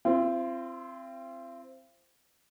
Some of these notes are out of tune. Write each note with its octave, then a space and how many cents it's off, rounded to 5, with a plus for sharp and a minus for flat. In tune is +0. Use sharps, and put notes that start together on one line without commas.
C4 +0 F4 -45